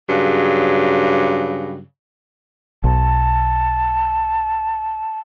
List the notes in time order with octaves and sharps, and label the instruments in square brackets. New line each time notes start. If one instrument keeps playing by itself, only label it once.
[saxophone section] G2 C#3 F#3
[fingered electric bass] B1 [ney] A5